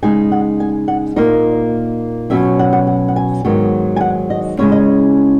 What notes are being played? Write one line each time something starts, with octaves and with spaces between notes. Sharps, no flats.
C#3 G#3 D#4 G#5
F#5
G#5
F#5
A#2 A#3 D#4 D#5
B2 F#3 C#4 E5
F#5
F#5
F#5
F#5
G#5
G#2 D#3 F#3 B3
G#5
F#5
D#5
C#3 G#3 C#4 E4 C#5
D#5